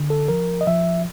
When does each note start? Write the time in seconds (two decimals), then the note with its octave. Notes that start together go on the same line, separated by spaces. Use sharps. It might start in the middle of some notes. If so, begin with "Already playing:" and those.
Already playing: D3
0.10 A4
0.28 F3 A#4
0.61 D#5
0.67 F3 E5